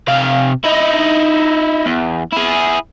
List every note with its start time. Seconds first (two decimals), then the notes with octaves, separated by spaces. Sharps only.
0.08 C3 F5
0.64 D#4 E4
1.86 E2
2.32 E4 G#4